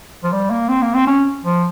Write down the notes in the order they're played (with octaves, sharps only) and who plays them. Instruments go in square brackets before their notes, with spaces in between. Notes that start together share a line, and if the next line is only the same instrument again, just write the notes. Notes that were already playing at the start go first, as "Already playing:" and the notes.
[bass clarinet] F3
G3
A#3
C4
A#3
C4
C#4
F3